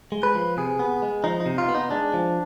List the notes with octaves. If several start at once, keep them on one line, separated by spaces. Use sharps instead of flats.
G#3
B4
F3
C3 G#4
B3
G#3
F3 D#4
D#4
C3
F4
B3
D#4
G#3 D4
F3